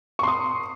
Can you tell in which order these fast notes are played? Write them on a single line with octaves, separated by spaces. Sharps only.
C#6 C6 D#6